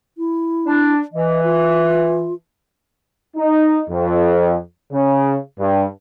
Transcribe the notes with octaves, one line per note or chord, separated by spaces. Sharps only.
E4
D4
E3 D#5
F4
D#4
F2
C#3
G2